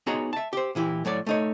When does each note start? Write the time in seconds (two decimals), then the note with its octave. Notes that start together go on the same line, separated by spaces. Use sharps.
0.07 B3 D#4 F#4 G#4 C#5 A#5
0.33 E5 A5
0.53 G4 C5
0.75 A#2 E3 E4 G4
1.05 A2 F#3 C#5 D5
1.27 A3 D#4 C#5